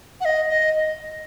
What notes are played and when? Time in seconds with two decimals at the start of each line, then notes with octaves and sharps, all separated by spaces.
0.20 F#5
0.25 D#5
0.49 D#5